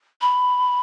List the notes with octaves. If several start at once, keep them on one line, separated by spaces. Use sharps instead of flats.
B5